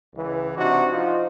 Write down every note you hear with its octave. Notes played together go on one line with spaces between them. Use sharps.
C#2 E3
C3 D4 D#4 F#4
F3 D#4 F4